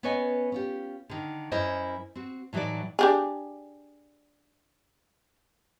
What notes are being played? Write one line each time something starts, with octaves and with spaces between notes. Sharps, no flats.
B3 C#4 B4 C#5 D#5 G#5
C#4 F4 G4
D3 D#3
F#2 C#4 E4 A#4 C5 D#5
C4 F#4
A2 E3 F#3 D#4 F#4 D5
D4 G4 G#4